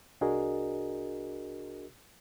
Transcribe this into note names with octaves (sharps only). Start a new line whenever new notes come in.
C2 D4 F#4 G#4 A#4 D#5